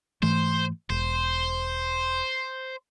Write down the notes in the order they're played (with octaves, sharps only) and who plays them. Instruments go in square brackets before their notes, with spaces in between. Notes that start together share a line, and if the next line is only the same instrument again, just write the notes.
[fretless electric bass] G#2 E3 A3 [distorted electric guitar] C5
[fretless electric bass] E1 [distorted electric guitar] C5